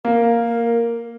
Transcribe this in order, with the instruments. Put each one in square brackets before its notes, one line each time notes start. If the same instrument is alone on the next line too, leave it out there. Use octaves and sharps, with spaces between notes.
[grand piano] A#3 [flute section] A#4